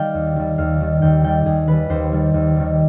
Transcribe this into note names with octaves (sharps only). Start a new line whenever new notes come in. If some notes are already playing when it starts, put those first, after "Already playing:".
Already playing: D#3 G3 F5 G5
D#2
D#3 G3
D#2 F5
D#3 G3
D#2 G5
D#3 G3 G5
D#2 G#4
D#3 G3 B4
D#2 C5
D#3 G3
D#2
D#3 G3